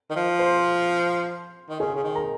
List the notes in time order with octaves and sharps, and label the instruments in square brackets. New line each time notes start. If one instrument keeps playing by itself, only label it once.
[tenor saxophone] D#3
F3
[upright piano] C5 C6
[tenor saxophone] D#3
[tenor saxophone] C#3 [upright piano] G#4 G#5
[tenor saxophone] C#3
D#3
[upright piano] A#4 A#5